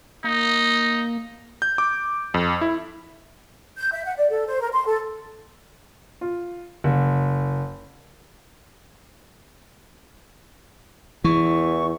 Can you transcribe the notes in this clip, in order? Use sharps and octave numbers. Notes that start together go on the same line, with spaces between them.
A#3 D#4
G6
D6
F2
E4
G6
E5
F#5
D5
A4
C5
A#4
C6
A4
F4
F#1
E2 E3 C#6